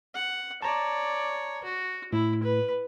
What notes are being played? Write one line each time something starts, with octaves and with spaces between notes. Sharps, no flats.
F#5
C#5 D5 A5 A#5
F#4
A2 E4
B4